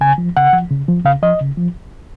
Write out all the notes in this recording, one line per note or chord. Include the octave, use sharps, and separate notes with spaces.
C#3 G#5
F3
C#3 F#5
F3
C#3
F3
C#3 F5
F3 D#5
C#3
F3